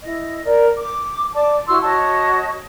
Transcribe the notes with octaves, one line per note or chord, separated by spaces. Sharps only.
E4 D#5
A#4 D5
D6
D5 A5 D6
E4 F#4 C6 E6
F#4 C#5 D#5 A5